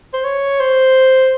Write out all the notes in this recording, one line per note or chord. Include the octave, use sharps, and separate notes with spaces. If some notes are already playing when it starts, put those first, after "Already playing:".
C5
C#5
C5